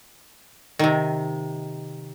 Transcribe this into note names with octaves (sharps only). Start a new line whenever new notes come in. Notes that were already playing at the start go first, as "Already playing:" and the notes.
C3 D#3